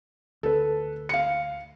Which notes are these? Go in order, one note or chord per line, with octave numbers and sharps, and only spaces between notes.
D2 A4 B4
F5 C#7